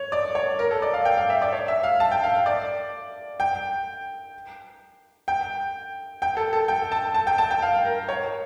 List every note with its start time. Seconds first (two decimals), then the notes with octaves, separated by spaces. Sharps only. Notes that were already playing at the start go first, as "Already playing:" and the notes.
Already playing: C#5
0.12 D5
0.35 C#5
0.59 A#4
0.71 A4
0.82 D5
0.94 F5
1.05 G5
1.17 F5
1.30 E5
1.42 D5
1.53 C#5
1.68 E5
1.83 F5
2.00 A5
2.11 G5
2.23 F5
2.46 D5
3.40 G5
5.28 G5
6.22 G5
6.37 A4
6.53 A4
6.68 G5
6.92 A5
7.14 A5
7.27 G5
7.38 A5
7.51 G5
7.62 F5
7.85 A#4
8.09 C#5